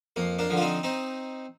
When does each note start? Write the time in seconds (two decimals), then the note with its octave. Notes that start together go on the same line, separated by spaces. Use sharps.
0.16 F2 A#3
0.39 A#3 D4
0.50 D3 F3
0.57 F4
0.61 C4 D#4
0.83 C4 D#4